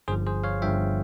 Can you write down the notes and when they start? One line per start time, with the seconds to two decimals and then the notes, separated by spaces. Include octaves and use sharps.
0.08 G1 G2 F3 G#4 C5
0.26 G#4 C5
0.44 C#5 F5
0.62 G1 G2 F3 E5 G5